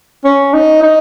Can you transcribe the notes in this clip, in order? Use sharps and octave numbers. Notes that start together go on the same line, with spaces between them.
C#4
D#4
D#4